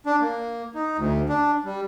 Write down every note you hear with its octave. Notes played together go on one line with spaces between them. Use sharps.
D4
A#3
D#4
D2
D4
G3